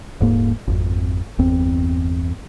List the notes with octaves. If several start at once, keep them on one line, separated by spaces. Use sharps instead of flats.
D#1 G#2 A#3
G#1 F2
G1 E2 C4